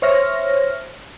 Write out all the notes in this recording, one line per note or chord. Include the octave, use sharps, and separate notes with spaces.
C5 C#5 E5 F6 A#6